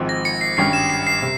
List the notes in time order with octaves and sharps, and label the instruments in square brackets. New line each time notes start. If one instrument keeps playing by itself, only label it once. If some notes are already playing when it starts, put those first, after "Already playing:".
Already playing: [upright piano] G#1 G#2 F3 C4
[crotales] A#6
C#7
C7
[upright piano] G#1 G2 G3 C#4 G4 [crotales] C7
[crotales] E7
C7
C7
[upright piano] C3